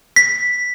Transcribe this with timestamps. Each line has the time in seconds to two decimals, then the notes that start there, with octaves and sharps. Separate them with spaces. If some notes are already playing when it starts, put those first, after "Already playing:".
0.16 B6